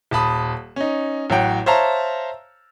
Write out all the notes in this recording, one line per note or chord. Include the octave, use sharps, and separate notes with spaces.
D#1 A5 B5 D#6
C#4 D#4
A1 F#3 F#5 G5
C5 C#5 E5 F5 A5 A#5